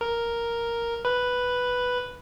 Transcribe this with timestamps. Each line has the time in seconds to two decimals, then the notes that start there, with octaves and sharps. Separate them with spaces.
0.01 A#4
1.05 B4